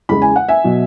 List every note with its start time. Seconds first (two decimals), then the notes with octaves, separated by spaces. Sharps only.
0.09 E2 C#3 E3 G#3 B5
0.22 G#5
0.36 F#5
0.48 E5 G#5
0.64 B2 F#3